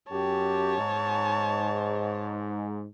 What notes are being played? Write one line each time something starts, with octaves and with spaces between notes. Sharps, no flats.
F#2 G4 C#5 A5
G#2